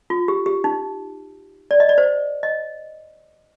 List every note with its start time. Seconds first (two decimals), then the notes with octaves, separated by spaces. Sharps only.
0.10 F4
0.28 G4
0.46 G4
0.64 D#4
1.71 D5
1.80 D#5
1.89 D5
1.98 C5
2.43 D#5